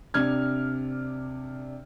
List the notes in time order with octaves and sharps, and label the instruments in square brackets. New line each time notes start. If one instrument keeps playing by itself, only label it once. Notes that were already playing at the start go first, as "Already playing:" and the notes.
[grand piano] C3 D4 F6 G#6